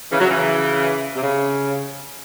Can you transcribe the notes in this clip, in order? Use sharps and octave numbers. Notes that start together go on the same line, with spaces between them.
C#3 E3
F#3
C#3 E3
C3
C#3